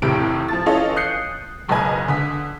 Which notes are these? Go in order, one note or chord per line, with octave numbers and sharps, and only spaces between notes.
F1 D#2 A2 C3 G4 D7
F3 A5 A6
E3 C#4 F4 A4 C#5 D#5
D#6 F#6 G6 C7 C#7
F#1 B1 B4 D#5 G#5
D3 D#6 B6